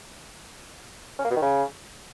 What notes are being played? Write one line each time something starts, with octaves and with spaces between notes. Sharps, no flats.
C#4
A#3
B2
D#3
C#3